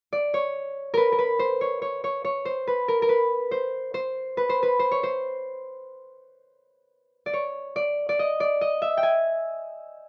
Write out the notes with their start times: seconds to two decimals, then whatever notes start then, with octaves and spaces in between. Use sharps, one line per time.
0.13 D5
0.34 C#5
0.94 A#4 B4
1.12 A#4
1.19 B4
1.39 C5
1.61 C#5
1.82 C#5
2.04 C#5
2.25 C#5
2.45 C5
2.67 B4
2.88 A#4
3.02 A#4
3.09 B4
3.51 C5
3.94 C5
4.37 B4
4.49 C5
4.63 B4
4.79 C5
4.91 C#5
5.03 C5
7.26 D5
7.33 C#5
7.76 D5
8.09 D5
8.19 D#5
8.40 D5
8.61 D#5
8.82 E5
8.97 G5
9.03 G#5